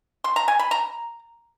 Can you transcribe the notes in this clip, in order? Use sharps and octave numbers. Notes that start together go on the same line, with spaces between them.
C6
A#5
G#5
B5
A#5